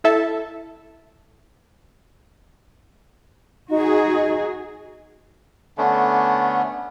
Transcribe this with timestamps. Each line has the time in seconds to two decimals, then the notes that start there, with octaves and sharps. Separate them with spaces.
0.04 E4 A4 E5 A5
3.69 D#4 F#4 G#4
5.78 D3 A3 B3 C#4 D4